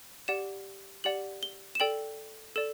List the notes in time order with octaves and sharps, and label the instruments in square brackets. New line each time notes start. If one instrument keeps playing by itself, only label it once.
[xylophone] G4 D5 F#5 E7
G4 D5 F#5 F#7
G7
E7
A4 D5 G5 F#7
A4 D5 E7